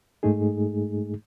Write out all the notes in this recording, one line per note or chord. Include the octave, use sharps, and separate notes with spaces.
G#2 G#3 A3 D#4 G#4